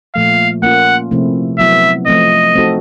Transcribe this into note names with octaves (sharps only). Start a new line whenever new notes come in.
A#2 F3 A3 F5
A#3 C#4 F4 F#5
C3 F3 A3 C4 E4
F#3 B3 E4 E5
F3 A3 C4 D#5
A3 C4 D#4 F#4 A4